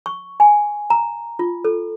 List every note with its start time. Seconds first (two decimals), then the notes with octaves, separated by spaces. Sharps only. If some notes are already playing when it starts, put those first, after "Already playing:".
0.06 C#6
0.40 G#5
0.90 A#5
1.39 F4
1.65 A4